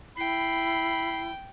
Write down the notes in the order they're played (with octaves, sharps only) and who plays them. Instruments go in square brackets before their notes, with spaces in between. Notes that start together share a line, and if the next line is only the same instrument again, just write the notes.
[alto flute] E4 [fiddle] G5 [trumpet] B5 [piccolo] C7